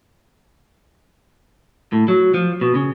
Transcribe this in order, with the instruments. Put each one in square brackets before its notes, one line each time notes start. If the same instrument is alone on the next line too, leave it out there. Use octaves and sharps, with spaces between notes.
[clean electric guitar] A2
F#3
F3
B2
C#3